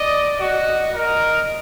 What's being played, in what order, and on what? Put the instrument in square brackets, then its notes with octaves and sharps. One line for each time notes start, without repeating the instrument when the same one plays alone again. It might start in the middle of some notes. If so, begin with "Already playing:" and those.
Already playing: [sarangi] D5 [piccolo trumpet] D#5
[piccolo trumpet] F#4 [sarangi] D#5
[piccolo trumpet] A#4 [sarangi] D#5